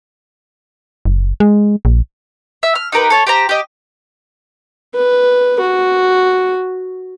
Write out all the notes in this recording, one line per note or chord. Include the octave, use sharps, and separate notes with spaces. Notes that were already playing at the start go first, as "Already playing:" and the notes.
F#1
G#3
A#1
E5
F6
D#4 G4 A#4 B4
A4 C#5 A5
G4 C5 A#5
G4 D#5
B4
F#4